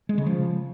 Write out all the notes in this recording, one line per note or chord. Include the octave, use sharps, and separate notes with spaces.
G#3
C#3
F3